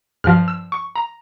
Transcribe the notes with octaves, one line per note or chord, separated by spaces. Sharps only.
G2 F3 F6
E6
C#6
A#5